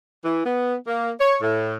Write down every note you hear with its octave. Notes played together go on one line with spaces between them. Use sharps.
E3
B3
A#3
C#5
A2